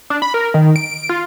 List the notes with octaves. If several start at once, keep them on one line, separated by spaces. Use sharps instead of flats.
D4
B5
A#4
D#3
D7
D7
F4